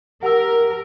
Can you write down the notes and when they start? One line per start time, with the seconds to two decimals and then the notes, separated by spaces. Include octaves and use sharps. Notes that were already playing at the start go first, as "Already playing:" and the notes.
0.23 G4 A#4 F#5 E6